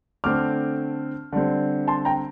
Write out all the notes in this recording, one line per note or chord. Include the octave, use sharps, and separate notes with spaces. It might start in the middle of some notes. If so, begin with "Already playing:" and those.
D3 A3 C4 D6 F6
D3 G3 C4
A5 C6
G5 A#5